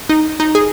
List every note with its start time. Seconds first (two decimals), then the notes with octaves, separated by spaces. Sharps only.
0.09 D#4
0.40 D#4
0.55 G#4